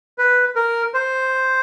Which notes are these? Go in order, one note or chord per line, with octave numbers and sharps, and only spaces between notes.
B4
A#4
C5